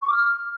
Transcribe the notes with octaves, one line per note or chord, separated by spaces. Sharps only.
C#6
D6
F6